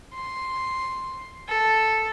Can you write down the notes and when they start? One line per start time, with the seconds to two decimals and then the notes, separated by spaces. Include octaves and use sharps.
0.14 C6
1.48 A4